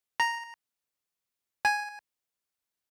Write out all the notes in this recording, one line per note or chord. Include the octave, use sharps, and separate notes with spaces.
A#5
G#5